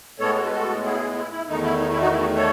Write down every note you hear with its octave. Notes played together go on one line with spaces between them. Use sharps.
A2 G#3 B3 A4 C#5
F#4 A4
B4
F#4 A4
E4 G#4
E4
E4
E2 D#3 A3 D#4
E4
D#4
E4
D#4 F#4
E4
D#4 F#4
A4 C#5